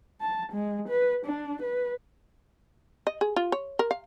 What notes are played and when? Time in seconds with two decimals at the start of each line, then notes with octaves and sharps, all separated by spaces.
0.21 A5
0.53 G#3
0.88 B4
1.26 D4
1.62 B4
3.07 D#5
3.21 G#4
3.36 F4
3.52 C#5
3.79 A#4
3.91 F5